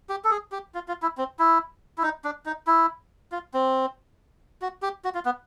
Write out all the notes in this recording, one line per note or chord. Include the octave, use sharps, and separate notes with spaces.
G4
A4
G#4
G4
F4
F4
E4
C4
E4
E4
D#4
D4
D#4
E4
F4
C4
F#4
G4
F#4
F4
B3